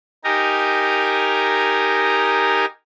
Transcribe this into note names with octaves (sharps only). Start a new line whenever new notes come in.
D#4 G4 A#4 G#5 A#5